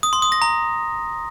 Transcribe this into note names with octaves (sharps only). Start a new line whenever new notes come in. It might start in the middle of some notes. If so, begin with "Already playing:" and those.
D#6
C6
D#6
A#6
A#5